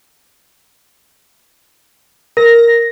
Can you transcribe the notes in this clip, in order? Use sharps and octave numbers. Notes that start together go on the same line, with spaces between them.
A#4 A#6